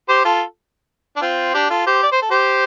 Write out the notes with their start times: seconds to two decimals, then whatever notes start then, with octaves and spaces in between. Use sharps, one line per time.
0.09 G4 C5
0.25 F4 A4
1.16 D4
1.22 C4 F4
1.54 D4 G4
1.70 F4 A4
1.86 G4 C5
2.03 D5
2.12 C5
2.22 A4
2.31 G4 C5